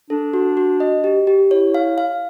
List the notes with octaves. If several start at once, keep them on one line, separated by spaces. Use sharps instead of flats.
D4 A4
F#4
F#4
D#5
G4
G4
E4 C#5
F5
F5